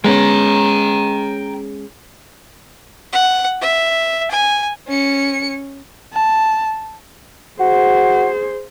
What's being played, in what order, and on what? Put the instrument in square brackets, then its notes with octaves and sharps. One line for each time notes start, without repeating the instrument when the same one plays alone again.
[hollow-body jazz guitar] G#3 B3 C#4 [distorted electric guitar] G5 A#5
[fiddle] F#5
E5
G#5
[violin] C#4 C#7
[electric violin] A5
[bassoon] F#4 [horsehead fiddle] G#4 C5